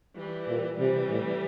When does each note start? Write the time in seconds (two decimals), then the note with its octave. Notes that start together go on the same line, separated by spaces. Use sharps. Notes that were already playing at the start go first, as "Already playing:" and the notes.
0.16 E3 G3
0.48 A#2
0.79 C3 E3 G3
1.10 A2